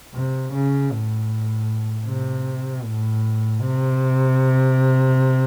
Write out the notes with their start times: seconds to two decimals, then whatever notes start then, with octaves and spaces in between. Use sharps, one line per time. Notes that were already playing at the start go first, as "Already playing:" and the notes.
0.14 C3
0.53 C#3
0.91 A2
2.06 C3
2.83 A2
3.60 C3